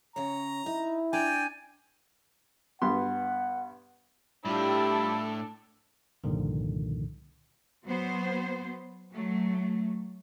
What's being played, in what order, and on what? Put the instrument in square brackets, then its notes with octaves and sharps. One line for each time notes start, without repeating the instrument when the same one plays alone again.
[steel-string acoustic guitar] C#3 C#5 [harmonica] A#5
[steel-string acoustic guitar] D#4 [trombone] E4
[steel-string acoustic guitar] D4 A#5 [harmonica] D5 G5 [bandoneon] G#5
[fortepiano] G2 B3 C6 [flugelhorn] F#5
[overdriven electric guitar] A2 [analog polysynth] G3 F4 G4 [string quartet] D4 A4 [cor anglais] E4
[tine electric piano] C2 G2 A#2 D3 D#3 F3
[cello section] F#3 B3 C5
F#3 A3